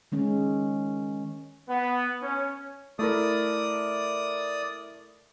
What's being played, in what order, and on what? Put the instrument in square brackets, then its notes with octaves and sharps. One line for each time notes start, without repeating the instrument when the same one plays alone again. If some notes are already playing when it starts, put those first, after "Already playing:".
[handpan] D#3 G#3 C#4
[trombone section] B3
C#4
[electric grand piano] A3 E4 A#4 [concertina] D5 D#6